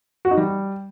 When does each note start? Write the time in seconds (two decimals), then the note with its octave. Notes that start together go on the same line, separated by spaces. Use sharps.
0.25 F#4
0.31 D#4
0.37 G3